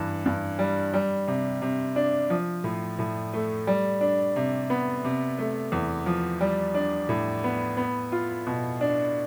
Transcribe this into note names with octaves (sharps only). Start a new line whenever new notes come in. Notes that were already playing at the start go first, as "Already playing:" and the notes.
Already playing: G2 E3
G2
G3
G3
C3
C3
D4
F3
A2
A2
A3
G3
D4
C3
B3
C3
A3
E2
F3
G3
D4
A2
B3
B3
F4
B2
D4